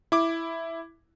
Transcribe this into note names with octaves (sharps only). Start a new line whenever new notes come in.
E4 D6